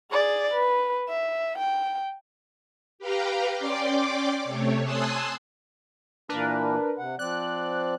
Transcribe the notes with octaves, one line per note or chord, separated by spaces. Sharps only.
G#4 D5
B4
E5
G5
G4 B4 F5 G5 A#5
C#4 D5 G5 C6 D6
C3 A3 C#5
G#5 A5 C6 D#6 E6 F#6
A#2 E3 A#3 D4 A#4 B4
C3 F#5
F3 C4 D5 F#6